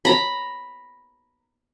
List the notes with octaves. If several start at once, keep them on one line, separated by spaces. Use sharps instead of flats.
A#5 B5